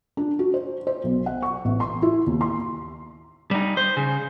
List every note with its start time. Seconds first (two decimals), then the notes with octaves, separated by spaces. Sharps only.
0.17 D4
0.39 F#4
0.54 C5
0.87 C5
1.04 B1
1.26 F#5
1.42 C#6
1.65 A1
1.80 C6
2.02 E4
2.26 D#2
2.41 C6
3.51 G3 D#4
3.77 C5
3.97 C#3